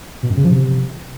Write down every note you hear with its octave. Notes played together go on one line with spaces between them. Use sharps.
B2
F#2
C#3
F3
C3